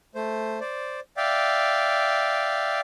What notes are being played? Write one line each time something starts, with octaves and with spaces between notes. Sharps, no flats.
A3 C5
C5 D5
D5 E5 F5 G5